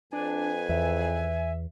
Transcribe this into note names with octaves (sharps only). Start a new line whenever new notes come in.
F2 D4 B4 G#5
E2 E5